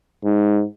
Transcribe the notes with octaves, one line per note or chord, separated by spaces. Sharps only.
G#2